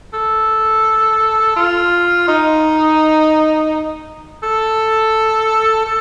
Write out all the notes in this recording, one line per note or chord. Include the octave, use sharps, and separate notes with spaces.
A4
F4
D#4
A4
A4